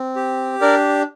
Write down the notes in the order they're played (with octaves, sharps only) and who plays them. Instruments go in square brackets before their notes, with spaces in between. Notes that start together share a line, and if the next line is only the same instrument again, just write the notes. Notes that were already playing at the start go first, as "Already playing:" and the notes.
Already playing: [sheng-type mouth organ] C4
G4
D4 A#4 D5